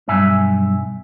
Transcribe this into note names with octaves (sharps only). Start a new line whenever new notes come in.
B1 G2 E5 G#5